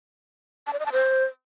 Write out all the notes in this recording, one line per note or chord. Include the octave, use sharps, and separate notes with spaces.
A5
D5
D#5
A5
C5